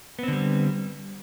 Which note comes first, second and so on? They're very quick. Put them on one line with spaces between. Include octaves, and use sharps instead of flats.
B3 C4 D3 G3